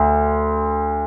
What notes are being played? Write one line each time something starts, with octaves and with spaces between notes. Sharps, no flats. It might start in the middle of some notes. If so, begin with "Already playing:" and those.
Already playing: D2